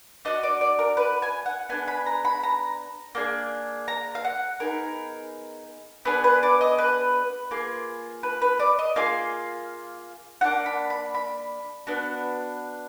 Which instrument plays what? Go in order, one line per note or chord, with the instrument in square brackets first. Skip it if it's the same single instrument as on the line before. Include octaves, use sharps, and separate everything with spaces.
[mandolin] D4 F#4 D#5
D5
D5
A#4
B4
G#5
F#5
B3 D4 G#4 G#5
B5
A#5
B5
A#5
A#3 D4 G#4
A#5
F5
F#5
B3 D#4 G#4 A#4
B3 D4 G#4 B4
B4
D5
D#5
B4
A#3 F4 G#4
B4
B4
D5
D#5
A#3 F4 G#4 F5
A#3 D4 F#4 F#5
B5
B5
B5
B3 D4 F#4